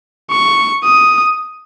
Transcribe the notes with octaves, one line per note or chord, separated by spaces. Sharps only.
C#6
D#6